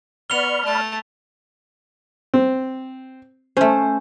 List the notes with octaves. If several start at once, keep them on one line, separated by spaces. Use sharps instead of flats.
B3 D5 B5 C#6 F6 F7 G7
A3 A5
C4
A3 C#4 C5